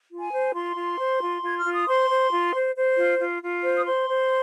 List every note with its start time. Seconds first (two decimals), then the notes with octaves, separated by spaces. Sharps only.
0.10 F4
0.20 G#5
0.32 C5
0.54 F4 C6
0.76 F4
0.98 C5
1.20 F4
1.42 F4 G#6
1.59 F6
1.64 F4
1.73 D#6
1.86 C5 C6
2.09 C5
2.31 F4
2.53 C5
2.75 C5
2.97 F4
3.19 F4
3.42 F4
3.63 C5
3.76 D#6
3.86 C5 C6
4.08 C5